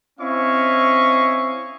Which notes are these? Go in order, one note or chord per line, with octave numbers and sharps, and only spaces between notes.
C4 C#4 E4 D#5 F5 C#6